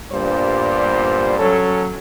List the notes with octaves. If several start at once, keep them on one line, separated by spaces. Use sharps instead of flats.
G2 A#2 G3 B3 C5
F#3 C#4 A4